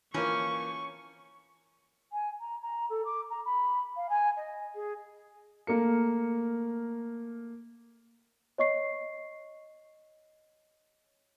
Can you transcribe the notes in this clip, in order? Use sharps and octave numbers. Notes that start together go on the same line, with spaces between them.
E3 F3 A#3 C#4 C#6
G#5
A#5
A#5
A4
D6
A#5
B5
F5
G#5
D#5
G#4
A3 A#3 A#4 C#7
C#5 D#5 C#6 C7